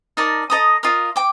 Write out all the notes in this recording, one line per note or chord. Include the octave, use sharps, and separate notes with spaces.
D#4 A#4 D5 A5
A4 D#5 A#5 D#6
F4 A#4 D#5
G5 D6